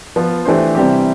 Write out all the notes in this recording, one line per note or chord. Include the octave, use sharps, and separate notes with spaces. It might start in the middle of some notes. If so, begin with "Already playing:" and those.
F3 B3 F4
E3 A3 D4 G4 C5
C3 E3 G3 C4 G4